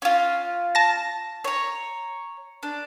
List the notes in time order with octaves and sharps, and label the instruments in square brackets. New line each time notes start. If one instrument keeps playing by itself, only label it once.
[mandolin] C#4 F4
[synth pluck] A5 A#6
[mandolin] C#5 A#5
D4